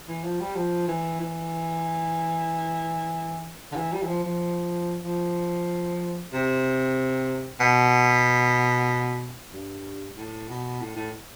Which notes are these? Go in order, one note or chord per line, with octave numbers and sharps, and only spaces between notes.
E3
F3
G3
F3
E3
E3
D3
E3
G3
E3
F3
F3
F3
C3
B2
G2
A2
B2
A2
A2